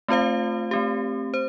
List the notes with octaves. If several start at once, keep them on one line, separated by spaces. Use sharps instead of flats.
A3 C4 F4 C5 F5
A3 C4 G4
C5